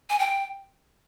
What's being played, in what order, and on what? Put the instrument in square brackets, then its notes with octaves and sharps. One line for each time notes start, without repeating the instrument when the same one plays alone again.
[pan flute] G#5
G5